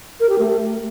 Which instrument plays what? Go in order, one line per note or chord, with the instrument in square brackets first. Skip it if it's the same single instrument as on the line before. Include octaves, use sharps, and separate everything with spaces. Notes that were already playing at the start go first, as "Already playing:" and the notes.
[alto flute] A#4
G4
A3